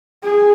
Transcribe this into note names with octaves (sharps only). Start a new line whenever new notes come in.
G#4